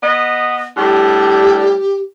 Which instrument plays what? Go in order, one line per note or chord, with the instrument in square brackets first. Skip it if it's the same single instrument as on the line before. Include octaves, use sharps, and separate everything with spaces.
[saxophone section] B3 D#5
[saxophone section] A2 G3 D4 [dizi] G4